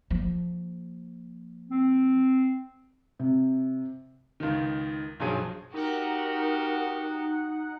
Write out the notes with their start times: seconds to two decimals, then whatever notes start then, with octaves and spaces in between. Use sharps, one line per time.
0.10 F3 A#3
1.69 C4
3.19 C3
4.40 C#2 D#3
5.20 B1 G2 F3 F#3 G#4 D#7
5.74 D#4 F#4 G4 A#4 F#5